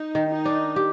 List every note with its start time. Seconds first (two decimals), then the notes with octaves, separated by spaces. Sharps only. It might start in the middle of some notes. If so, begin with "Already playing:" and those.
Already playing: D#4
0.15 D#3
0.30 D#4
0.45 D4
0.76 G4